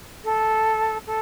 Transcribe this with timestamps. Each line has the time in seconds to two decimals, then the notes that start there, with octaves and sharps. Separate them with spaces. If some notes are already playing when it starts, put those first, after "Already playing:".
0.24 A4
1.07 A4